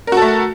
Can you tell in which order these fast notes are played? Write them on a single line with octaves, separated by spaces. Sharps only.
A#4 F#4 A4 A3